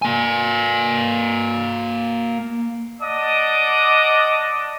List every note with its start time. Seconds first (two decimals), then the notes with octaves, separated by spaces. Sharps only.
0.02 A#3 G#5
3.01 D5 D#5 F#5 A5 D6 D#6